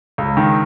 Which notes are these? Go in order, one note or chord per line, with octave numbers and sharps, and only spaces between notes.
C#2
D#3